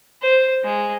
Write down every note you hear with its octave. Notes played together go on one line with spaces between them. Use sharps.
C5
G#3